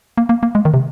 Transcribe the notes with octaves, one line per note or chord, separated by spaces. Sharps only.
A#3
A#3
A#3
G#3
D#3
C3